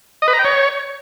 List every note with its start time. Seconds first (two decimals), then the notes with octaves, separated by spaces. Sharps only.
0.22 D#5
0.28 B4
0.33 A#5
0.39 G5
0.45 C#5